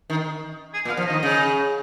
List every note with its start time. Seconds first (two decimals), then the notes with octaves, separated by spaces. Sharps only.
0.10 D#3
0.74 G#4
0.85 A#2
0.90 F5
0.97 F3
1.06 D#3 D#5
1.23 C#3